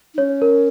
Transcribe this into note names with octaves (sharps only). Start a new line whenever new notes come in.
D#4
C#4 C#5
A#4